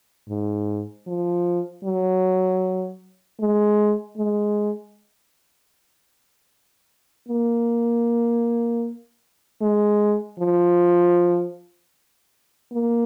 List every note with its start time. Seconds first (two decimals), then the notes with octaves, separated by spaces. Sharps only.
0.29 G#2
1.07 F3
1.84 F#3
3.40 G#3
4.17 G#3
7.28 A#3
9.61 G#3
10.40 F3
12.72 A#3